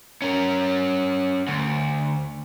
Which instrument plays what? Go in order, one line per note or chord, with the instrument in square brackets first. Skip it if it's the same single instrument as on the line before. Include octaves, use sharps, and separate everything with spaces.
[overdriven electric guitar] C#4 A#4
D2